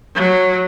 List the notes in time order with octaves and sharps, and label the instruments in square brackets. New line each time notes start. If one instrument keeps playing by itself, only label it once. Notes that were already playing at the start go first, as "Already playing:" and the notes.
[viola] F#3